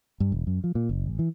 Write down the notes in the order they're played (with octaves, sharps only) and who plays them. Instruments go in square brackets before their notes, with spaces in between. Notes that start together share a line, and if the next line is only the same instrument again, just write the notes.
[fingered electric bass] G2
E1
F#2
F3
A#2
F#1
A1
E3